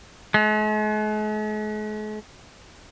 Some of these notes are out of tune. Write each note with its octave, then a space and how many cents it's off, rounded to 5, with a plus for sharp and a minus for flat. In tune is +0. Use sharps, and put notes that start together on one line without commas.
G#3 +45